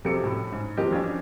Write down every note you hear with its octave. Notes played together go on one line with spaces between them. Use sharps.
F2 C3 G4 A4 D6 C#7
A2
G#2
E3 F3 C4 G4 A#4 D#5
F2 C#4 D4